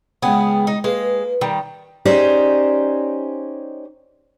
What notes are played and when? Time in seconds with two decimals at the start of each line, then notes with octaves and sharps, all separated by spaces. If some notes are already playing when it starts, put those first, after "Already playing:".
0.22 C#2 C#3 B3 G#4 G5
0.67 D#4
0.84 G#3 A#3 B4
1.41 D#3 G3
2.05 C#4 D#4 G4 G#4 C5 D5